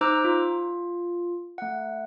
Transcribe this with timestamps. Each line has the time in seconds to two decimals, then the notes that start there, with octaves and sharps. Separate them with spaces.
0.01 D#4 C5 A#5 D6 E6 F#6
0.25 F4
1.58 A3 F#5